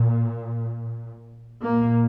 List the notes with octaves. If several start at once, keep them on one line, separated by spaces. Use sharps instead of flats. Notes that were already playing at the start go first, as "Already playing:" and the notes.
Already playing: A#2
A#2 A#3